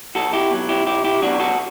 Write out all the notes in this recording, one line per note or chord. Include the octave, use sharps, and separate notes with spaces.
B1 F#4 A4
E4 G4
B2 F#3
E4 G4
B1 E4 G4
E4 G4
B2 F#3 D4 F#4
F#4 A4